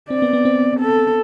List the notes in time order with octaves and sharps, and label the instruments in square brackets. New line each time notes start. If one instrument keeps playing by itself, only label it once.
[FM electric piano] C4 [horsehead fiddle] D5
[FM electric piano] B3
B3
C4
[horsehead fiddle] A4